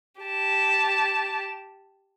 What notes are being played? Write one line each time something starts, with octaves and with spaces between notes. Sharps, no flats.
G4 A5